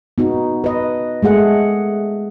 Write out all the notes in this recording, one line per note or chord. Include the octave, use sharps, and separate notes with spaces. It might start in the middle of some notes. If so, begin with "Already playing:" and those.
B3 D#4 F#4
B4 D#5
G#3 A3 G#4 F#5